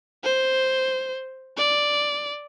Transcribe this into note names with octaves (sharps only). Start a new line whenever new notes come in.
C5
D5